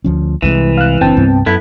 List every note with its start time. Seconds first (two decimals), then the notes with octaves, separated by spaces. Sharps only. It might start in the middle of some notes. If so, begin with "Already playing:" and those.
0.05 D2 F3 C#4
0.42 C2 C3 E3 G#3
0.78 F5 F#6
1.01 F#1 C4 D4 G5 A5
1.17 C2 G2 B3
1.46 F#2 B3 E4 A4